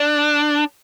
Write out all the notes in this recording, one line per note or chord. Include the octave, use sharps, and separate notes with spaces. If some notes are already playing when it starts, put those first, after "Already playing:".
Already playing: D4